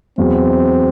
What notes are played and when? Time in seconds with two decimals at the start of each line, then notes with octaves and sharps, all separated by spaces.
0.18 E2 B2 F#3 C4